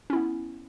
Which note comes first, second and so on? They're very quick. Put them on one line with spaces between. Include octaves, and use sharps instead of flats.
C#4 E4 B3